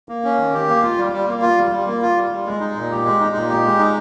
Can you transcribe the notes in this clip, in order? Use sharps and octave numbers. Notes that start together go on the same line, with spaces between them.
A#3
C#4
D#3
G4
A#3
F4
G3
G3
A#3
F4
G3
G3
A#3
F4
G3
G3
G#3
D#4
A#2
G4
G#3
D#4
A#2
G4
G#3
D#4